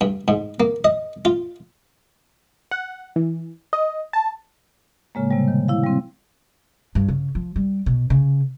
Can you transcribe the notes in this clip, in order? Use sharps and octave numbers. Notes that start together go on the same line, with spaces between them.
G2
G#2
A#3
D#5
F4
F#5
E3
D#5
A5
A2 C#3 G#3 A#3
C3 G3
D#3
E4 F5
G3 C4
G2
C#3
F3
G3
B2
C#3